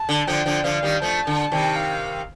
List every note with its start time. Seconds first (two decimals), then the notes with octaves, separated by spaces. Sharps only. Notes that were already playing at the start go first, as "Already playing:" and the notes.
Already playing: A5
0.09 D3
0.27 D3 F3 G5
0.46 D3 F3
0.64 D3 F3 F5
0.83 D#3 G3
1.02 F3 A3 A5
1.27 D3
1.52 C3 D#3
1.76 F5